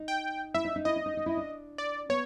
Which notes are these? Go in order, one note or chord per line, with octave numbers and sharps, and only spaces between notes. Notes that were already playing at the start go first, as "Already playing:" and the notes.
Already playing: D#4
G5
E4 E5
D#4
D#4
E4 D#5
D4
D#4
D#4
E4
D4
D5
B3 C#5